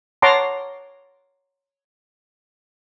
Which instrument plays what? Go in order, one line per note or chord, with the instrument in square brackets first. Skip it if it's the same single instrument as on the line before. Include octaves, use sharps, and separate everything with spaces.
[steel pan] C#5 F#5 A5 A#5 C6 D6